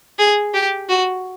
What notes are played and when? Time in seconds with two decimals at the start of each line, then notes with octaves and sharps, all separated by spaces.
0.19 G#4
0.54 G4
0.89 F#4